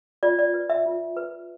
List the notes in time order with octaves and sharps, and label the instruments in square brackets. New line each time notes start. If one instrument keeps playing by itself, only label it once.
[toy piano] F4 D5
D5
B4
E5
F4
B4